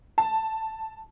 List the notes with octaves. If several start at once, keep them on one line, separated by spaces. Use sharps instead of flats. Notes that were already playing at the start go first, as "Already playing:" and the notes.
A5